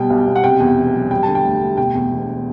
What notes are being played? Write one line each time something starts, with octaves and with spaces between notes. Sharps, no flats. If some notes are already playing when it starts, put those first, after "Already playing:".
Already playing: B2 G3 G5
B1
B1
F#5
C3 G5
E2
E1
F#3
G3 G5
D3 A5
G5
D2
D2
B2 G5
E2
E1